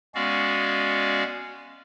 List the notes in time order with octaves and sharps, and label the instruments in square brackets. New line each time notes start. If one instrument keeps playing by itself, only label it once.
[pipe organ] G#3 B3 C#4 F#4 D5 F5